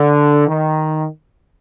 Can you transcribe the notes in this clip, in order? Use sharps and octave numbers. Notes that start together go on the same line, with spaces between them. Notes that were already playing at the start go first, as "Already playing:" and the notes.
Already playing: D3
D#3